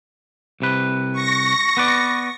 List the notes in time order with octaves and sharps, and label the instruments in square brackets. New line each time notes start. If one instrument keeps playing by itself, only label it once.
[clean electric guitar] C2 C3 B4
[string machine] C#6 A#6
[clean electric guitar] B3 B4 D5